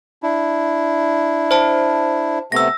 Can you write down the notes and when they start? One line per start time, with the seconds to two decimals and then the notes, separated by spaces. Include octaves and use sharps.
0.23 D4 E4
1.51 C5 A5
2.52 C3 A3 B3 E6 A#6